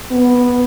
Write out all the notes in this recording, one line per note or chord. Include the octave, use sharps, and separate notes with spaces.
B3